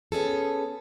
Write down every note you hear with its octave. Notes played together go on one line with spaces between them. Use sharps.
B3 C#4 G#4 A4